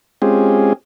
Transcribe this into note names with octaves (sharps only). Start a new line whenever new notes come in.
G#3 C4 C#4 F4 G4 G#4